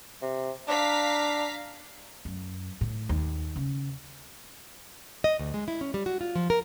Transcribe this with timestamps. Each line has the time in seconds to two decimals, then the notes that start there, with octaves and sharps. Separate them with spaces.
0.22 C3
0.68 D4 F5 A#5 B6
2.25 F#2
2.81 A2
3.09 D#2
3.56 C#3
5.24 D#5
5.39 D2
5.54 G#3
5.68 E4
5.81 C#4
5.94 G3
6.06 F#4
6.21 F4
6.35 F3
6.50 A#4